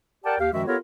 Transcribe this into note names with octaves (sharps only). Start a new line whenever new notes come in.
G4 A#4 D5 F#5 G5 A5
D#2 G4 F5
F#2 D#3 F3 G#3 F#4 E5
B3 F4 G4 A4 A#4 C#5